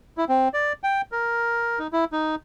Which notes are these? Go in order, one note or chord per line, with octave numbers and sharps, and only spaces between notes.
E4
C4
D5
G5
A#4
D#4
E4
D#4